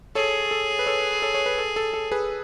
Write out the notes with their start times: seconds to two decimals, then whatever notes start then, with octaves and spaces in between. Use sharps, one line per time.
0.15 G#4 A4 C#5
0.51 A4
0.79 B4
0.86 A4 C#5
1.22 A4 C#5
1.34 C#5
1.46 B4
1.58 A4
1.76 A4
1.94 A4
2.12 G#4 B4